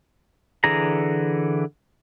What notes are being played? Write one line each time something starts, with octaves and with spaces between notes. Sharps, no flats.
D3 E3 G#4 A#5